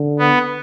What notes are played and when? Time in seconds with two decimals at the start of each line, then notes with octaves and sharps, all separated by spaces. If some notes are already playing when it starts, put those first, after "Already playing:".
Already playing: D3
0.19 B3